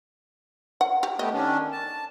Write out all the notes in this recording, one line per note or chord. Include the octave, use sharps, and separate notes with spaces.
F#5
G4
A3 B3 G4 D#5
D#3 C#4 D4
A5